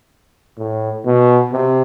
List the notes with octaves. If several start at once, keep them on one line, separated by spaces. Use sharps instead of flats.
A2
B2
C3